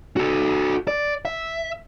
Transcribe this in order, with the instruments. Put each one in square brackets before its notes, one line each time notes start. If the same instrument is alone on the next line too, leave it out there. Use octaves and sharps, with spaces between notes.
[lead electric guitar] F#4 A4
D5
E5